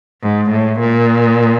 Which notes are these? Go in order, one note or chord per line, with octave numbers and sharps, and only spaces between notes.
G#2
A2
A#2